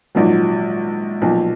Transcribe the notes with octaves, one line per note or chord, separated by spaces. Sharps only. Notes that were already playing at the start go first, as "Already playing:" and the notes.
A#1 G#2 D#3 F#3
B1 A#2 F3